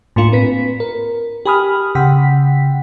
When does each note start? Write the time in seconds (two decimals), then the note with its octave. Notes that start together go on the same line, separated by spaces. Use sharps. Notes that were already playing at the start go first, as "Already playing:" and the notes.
0.16 A2 A#3 D4 F4 C#7
0.32 C4 B4 B6
0.80 A#4
1.45 G4 G#5 B5 D#6 F6
1.95 C#3 F#5 G5 B6